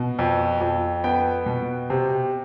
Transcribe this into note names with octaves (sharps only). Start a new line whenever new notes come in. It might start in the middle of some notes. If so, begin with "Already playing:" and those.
Already playing: B2
F2
F2
B3 G5
B2
C3